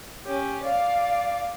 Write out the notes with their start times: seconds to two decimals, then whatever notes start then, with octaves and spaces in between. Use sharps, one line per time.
0.25 C#4 G4
0.64 D5 F5